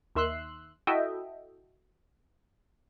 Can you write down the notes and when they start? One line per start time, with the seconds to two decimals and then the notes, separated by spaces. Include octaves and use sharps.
0.15 D#2 D#3 E5 C6 E6 F#6
0.87 E4 F#4 A4 D#5 E5 G5